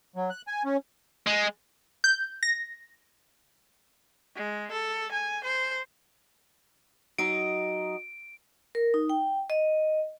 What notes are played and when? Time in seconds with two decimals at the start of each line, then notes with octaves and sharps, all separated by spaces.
0.16 F#3
0.30 F#6
0.47 G#5
0.65 C#4
1.27 G#3
2.04 G6
2.43 A#6
4.35 G#3
4.71 A4
5.12 G#5
5.44 C5
7.18 F#3 D#4 D#5 D7
8.75 A#4
8.94 D#4
9.10 G5
9.50 D#5